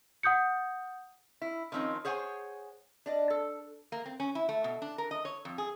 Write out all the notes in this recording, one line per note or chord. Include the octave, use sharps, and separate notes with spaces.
F#5 D#6 G6 C#7
E4
D#3 F3 C4 C#4 D#4
G#4 C5 C#5 F#5 G#5
D4 D5 D#5
A4
A#3
C4
C#4
E4
A3
B2
D4
A#4
D#5
C#5
F2
G#4